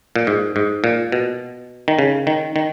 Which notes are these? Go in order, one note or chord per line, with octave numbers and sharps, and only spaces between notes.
A#2
G#2
G#2
A#2
B2
D#3
C#3
D#3
D#3